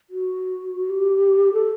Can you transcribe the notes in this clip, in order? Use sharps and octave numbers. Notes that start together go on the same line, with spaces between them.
F#4
G4
A4